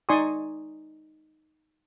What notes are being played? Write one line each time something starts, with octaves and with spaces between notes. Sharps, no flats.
D#4 D5 G#5 C6 C#6 D#6